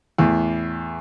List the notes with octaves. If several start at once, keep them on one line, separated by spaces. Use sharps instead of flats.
E2 A2